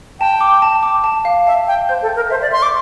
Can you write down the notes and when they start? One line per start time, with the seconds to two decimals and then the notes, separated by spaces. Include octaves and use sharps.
0.20 G5 A5
0.41 D6
0.62 A5
0.83 D6
1.04 A5
1.25 F5
1.47 E5 A5
1.67 F5 G5
1.89 C5 G6
2.02 A4
2.09 G6
2.16 A#4
2.30 C5 E5
2.42 D5
2.51 E5 C6
2.62 D6